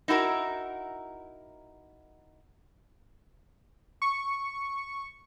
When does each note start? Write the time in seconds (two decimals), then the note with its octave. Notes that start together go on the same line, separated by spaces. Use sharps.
0.08 D#4 E4 F#4 A#4
4.02 C#6